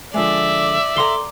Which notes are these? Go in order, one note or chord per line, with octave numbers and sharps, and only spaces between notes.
D3 F3 G#3 D5 E5
A4 F5 F#5 A#5 C6 G7